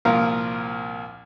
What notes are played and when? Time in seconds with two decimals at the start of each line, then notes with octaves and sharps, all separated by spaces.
0.05 C2 A#2 F3 A#4 F5